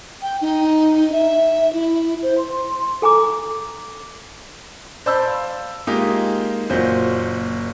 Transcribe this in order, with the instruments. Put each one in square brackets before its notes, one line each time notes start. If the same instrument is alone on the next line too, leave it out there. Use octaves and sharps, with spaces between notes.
[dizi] G5
D#4
E5
E4
C5
C6
[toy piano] A4 G#5 A#5 D6
[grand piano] C5 D5 A5 B5 E6 G6
F5
G#3 A#3 D#4 F4 G4
F#1 A#2 F4 F#4 C5 G6